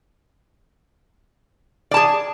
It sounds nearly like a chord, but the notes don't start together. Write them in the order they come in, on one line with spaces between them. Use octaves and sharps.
D5 A5 G#4